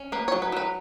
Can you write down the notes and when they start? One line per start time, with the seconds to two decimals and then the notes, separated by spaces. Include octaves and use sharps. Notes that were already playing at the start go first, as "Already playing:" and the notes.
Already playing: C#4
0.12 A#3 B4
0.28 C#5
0.32 F#3
0.42 B4
0.52 F#3 B4